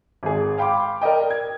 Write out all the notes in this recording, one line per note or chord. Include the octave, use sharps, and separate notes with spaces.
G#1 G#4
F5 G5 B5 C6 D6
A#4 D5 D#5 G5
G#6